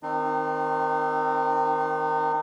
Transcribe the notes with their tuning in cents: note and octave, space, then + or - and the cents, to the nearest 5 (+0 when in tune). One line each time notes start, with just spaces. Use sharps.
D#3 -5 C4 +0 D#4 -35